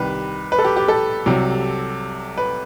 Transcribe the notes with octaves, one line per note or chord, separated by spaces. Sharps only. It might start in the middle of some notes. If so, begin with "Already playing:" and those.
Already playing: C2 C3 D#3 B4
B4
A4
G4
G4
A4
C2 C3 F#3
B4